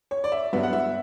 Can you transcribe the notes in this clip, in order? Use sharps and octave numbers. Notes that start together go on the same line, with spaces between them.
C#5
D5
E5
G2 F#3 B3 E5
F#5
E5